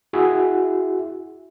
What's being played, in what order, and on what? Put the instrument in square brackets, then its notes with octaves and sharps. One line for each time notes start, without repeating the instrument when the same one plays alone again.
[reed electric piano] E4 F#4 G#4 E5 F#5